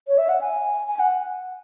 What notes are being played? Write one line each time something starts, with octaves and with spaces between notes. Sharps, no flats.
C#5
E5
F#5
G#5
G#5
F#5